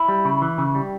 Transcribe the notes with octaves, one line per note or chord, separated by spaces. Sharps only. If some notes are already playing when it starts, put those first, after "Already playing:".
Already playing: E4
G3
C#3
E3
C#3
G3